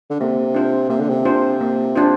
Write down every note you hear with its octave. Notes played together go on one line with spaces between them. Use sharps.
D3
C3 A#3
D4 F4 C5
C3 A#3
D3
C3
D4 F4 C5
A#3
D4 F4 C5